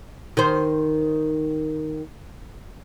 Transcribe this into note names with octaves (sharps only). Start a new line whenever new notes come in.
D#3 C5